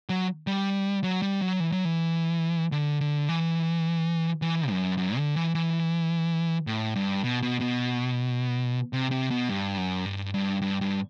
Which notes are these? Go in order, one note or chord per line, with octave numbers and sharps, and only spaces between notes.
F#3
G3
F#3
G3
F#3
E3
F#3
E3
D3
D3
E3
E3
F#2
F#2
D3
E3
E3
A2
G2
B2
B2
B2
C3
C3
B2
G2
F#2
G2
G2
G2
G2